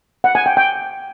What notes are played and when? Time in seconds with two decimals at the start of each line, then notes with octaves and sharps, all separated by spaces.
0.24 F#5
0.35 G#5
0.46 G5
0.57 G5